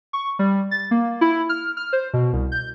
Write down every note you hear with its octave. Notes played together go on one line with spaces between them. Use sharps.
C#6
G3
A6
A#3
E4
F6
F6
C5
B2
C2
G6